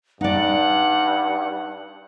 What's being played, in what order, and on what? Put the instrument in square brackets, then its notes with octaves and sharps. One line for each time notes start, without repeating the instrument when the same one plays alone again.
[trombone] G2 [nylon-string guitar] D#4 D5 [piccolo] F#5